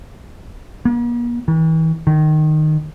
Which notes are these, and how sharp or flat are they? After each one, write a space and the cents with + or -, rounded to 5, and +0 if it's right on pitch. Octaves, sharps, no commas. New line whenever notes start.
A#3 +45
E3 -40
D#3 -15